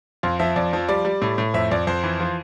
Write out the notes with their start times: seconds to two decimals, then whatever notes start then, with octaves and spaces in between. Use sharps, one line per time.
0.23 F2 F4
0.39 F3 E5
0.56 F2 D5
0.73 F3
0.89 G3 D5
1.05 G3
1.22 A2
1.38 A2
1.54 F2 E5
1.71 F2 D5
1.87 F2 C5
2.04 E3
2.20 F3